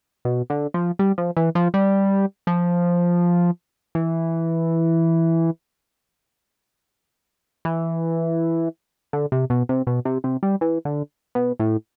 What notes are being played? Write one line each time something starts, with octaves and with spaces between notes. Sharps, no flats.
B2
D3
F3
G3
F3
E3
F3
G3
F3
E3
E3
D3
C3
B2
C3
B2
C3
C3
G3
E3
D3
B2
A2